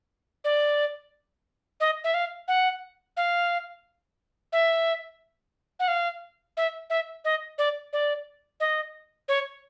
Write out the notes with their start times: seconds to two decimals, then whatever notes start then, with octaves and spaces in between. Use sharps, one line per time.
0.44 D5
1.80 D#5
2.04 E5
2.14 F5
2.48 F#5
3.17 F5
4.53 E5
5.80 F#5
5.88 F5
6.57 E5
6.90 E5
7.25 D#5
7.58 D5
7.93 D5
8.60 D#5
9.28 C#5